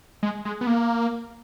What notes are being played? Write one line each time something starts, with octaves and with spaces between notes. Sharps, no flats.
G#3
G#3
B3
A#3